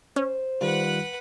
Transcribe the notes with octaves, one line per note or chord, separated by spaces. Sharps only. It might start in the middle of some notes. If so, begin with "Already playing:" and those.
C#4 C5
D#3 G3 F4 B4 F#5